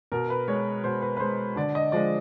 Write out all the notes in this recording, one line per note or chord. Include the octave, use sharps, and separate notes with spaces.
B2 A#4
B4
G#3 C#5
B2 C5
B4
B4
G#3 C5
D3 D5
D#5
F3 G#3 D5